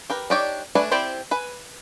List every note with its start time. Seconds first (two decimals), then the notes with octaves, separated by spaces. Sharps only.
0.10 G4 A#4 B4
0.30 D4 D#4 G4 C#5 D5
0.75 A3 D4 B4 D5 G#5
0.91 C4 E4 G4 C5 D5
1.31 B4 G#5